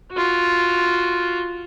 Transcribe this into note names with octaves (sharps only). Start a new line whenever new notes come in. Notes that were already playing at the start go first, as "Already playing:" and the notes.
F4 F#4